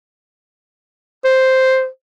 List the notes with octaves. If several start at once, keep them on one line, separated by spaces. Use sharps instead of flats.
C5